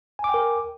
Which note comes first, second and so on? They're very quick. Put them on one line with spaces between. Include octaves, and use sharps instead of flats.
G#5 D6 G5 A#4